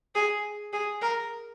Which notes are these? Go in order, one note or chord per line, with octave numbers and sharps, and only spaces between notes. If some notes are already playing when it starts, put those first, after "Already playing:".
G#4
G#4
A#4